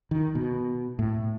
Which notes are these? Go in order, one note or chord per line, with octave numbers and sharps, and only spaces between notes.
D#3
B2
A2